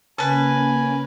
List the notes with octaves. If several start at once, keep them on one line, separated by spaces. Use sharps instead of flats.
C#3 A#3 C#4 A#4 B4 G#5 A5